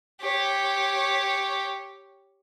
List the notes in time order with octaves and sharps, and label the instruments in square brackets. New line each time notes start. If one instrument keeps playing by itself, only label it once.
[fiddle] G4 C#5